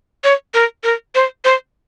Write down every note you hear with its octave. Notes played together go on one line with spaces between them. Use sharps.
C#5
A#4
A#4
C5
C5